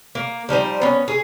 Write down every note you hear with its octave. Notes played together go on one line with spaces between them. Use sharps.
A#3
F3 G3 D#4 C5
B3 C#4
G#4